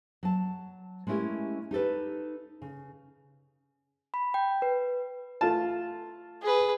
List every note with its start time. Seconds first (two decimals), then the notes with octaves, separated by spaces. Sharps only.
0.23 F#3 A5
1.07 G#3 A3 C#4 E4 G4 A#4
1.71 D#4 G4 A4 B4
2.62 C#3
4.14 B5
4.34 G5
4.62 B4
5.41 A3 F4 A5
6.43 G#4 B4